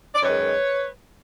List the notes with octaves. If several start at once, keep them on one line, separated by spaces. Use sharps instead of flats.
D5
F#2 D#3 G#3 B4 C#5